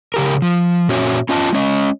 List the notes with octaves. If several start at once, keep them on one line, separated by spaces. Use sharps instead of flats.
C#3 G4 A#4
F3
A#2 C#4 F#4 C#5 E5
C#4 F4 D#5 A5
G#3 C#4 D#5